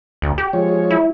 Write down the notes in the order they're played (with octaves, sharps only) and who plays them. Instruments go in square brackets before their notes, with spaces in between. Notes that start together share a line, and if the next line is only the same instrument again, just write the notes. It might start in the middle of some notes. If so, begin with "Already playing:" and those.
[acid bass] D2
G4
[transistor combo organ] F3 G#3 C#5
[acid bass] E4